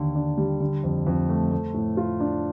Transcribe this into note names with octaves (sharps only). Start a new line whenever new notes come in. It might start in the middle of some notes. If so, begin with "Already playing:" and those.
Already playing: D#2 D3
D4
G3
D3
F2
F2
A3
A3
A2
F4
D4